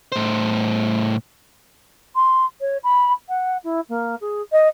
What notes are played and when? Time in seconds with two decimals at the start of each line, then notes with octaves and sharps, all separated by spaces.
0.12 A2 C5
2.15 C6
2.61 C#5
2.83 B5
3.28 F#5
3.64 E4
3.89 A#3
4.21 G#4
4.52 D#5